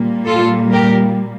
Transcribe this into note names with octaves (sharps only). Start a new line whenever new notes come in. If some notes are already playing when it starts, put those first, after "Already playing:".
Already playing: A#2 G3 A#3
F4 A4
G4 A#4